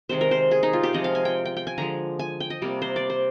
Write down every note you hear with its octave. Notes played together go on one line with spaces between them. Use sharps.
C3 D#3 G#3 C5
A#4
C5
G#4
D#4
F4
G4
C3 F3 G#3 D#5
F5
G#5
G5
G5
G5
G#5
D3 F3 G#3 A#5
G#5
G5
D#5
C3 G3 A#3
C5
D5
C5